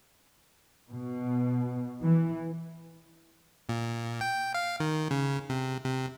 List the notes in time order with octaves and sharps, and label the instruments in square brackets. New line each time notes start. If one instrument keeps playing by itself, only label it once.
[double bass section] B2
E3
[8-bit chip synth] A#2
G5
F5
D#3
C#3
C3
C3